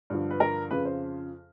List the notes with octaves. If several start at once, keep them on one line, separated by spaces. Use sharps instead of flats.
G2 D3 F3
B4
A#4
F2 C#3 F3 B4
C5